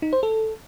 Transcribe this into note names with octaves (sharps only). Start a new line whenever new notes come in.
D#4
C5
A4